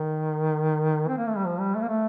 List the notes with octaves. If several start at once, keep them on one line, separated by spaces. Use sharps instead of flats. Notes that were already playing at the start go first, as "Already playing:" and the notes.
Already playing: D#3
C4
A#3
A3
G3
F3
G3
A3
A#3
A3